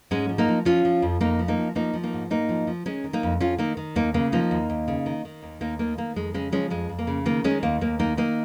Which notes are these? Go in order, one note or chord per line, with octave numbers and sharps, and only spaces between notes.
G#2 G#3 C#4
F3
A#3 D#4
F3
F3 C#4 F4
F3
F2
F2 A#3 D#4
F3
A#3 D#4
F3
F3 A#3 D#4
F3
A#3 D#4
G#2
G#2 A#3 D#4
F3
F3
D#3 G#3 C#4
D#3
A#3 D#4
F2
F2 C#4 F4
D#3 A#3 D#4
D#3
D#2 A#3 D#4
C#3 A#3
F3 A#3 D#4
D#2
D#2
C#3
D#3
D#3
D#2
D#2 A#3 D#4
D#3 A#3
D#3 A#3
F2 G#3
C#3 G#3 C#4
F3 G#3 C#4
F2 G#3
F2
A#3
C#3
D#3 A#3
D#3 G#3 C#4
D#2 A#3
D#2 A#3
D#3 A#3 D#4
D#3 A#3 D#4